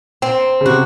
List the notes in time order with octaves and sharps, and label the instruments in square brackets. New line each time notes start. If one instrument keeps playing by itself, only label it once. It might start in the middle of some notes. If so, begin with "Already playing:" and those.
[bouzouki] C4
[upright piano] C#3
[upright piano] C3 [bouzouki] F#4